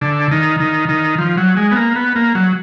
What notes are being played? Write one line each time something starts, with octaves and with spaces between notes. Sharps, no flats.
D3
D#3
D#3
D#3
F3
F#3
G#3
B3
A#3
B3
A#3
F#3